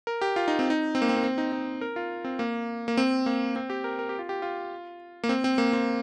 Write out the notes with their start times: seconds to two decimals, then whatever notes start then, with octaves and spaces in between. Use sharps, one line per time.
0.07 A#4
0.21 G4
0.36 F4
0.48 D#4
0.59 C4
0.70 D#4
0.95 C4
1.02 A#3
1.09 C4
1.16 A#3
1.24 C4
1.38 D#4
1.52 D#4
1.81 A#4
1.96 F4
2.24 C4
2.39 A#3
2.88 A#3
2.97 C4
3.26 A#3
3.56 C4
3.70 G4
3.84 A#4
3.99 A#4
4.09 G4
4.19 F4
4.29 G4
4.42 F4
5.24 A#3
5.29 C4
5.44 C4
5.58 A#3
5.73 C4